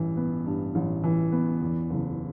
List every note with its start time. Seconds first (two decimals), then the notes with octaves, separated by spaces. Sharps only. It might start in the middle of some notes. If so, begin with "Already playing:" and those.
Already playing: A1 G2 E3
0.17 B3
0.46 G2
0.75 A1
1.04 E3
1.32 B3
1.62 E2
1.90 F#1